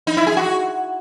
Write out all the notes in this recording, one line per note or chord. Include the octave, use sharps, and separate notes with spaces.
D#4
E4
G#4
F#4